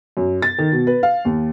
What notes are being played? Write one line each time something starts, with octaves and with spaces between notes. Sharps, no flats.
F#2
A6
D#3
B2
B4
F5
D#2